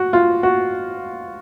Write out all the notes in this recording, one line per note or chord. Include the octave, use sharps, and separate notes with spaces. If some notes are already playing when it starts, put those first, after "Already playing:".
Already playing: F#4
F4
F#4